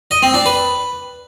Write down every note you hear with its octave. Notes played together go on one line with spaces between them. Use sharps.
D#5
C4
D4
B4